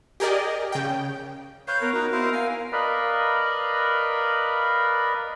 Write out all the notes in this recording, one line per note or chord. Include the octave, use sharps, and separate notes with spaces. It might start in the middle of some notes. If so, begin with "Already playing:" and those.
G4 G#4 A#4 D5 D#5
C#3 G5
B4 C#5 F5 G6
B3 A#4
D#4 F#4 B4
B3 E4 C5 F5
F5 G#5
A#4 B4 D5 D#5 F5 B5